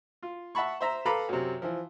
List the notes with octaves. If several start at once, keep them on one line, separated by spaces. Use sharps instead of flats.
F4
E5 F#5 A5 B5 C#6
C5 E5 A#5
A4 B4 F5 A#5 B5 D6
F#2 C3
E3 F3